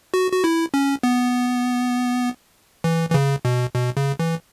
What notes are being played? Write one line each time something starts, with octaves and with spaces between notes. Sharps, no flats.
F#4
F#4
E4
C#4
B3
E3
E3
C#3
B2
B2
C#3
E3